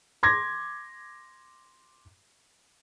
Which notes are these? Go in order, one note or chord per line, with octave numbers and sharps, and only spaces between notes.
C6 D6 G#6 A#6